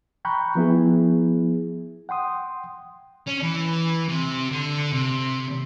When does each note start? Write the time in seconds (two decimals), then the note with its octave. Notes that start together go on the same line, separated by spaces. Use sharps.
0.25 G5 A#5 B5 C#6 F#6 G6
0.55 F3 B3 E4 G#4
2.09 F#5 G5 C6 D#6
3.27 C#4
3.42 E3
4.09 C3
4.51 D3
4.93 C3